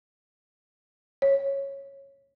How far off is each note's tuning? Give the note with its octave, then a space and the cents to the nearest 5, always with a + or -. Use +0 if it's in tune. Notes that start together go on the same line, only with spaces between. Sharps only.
C#5 -10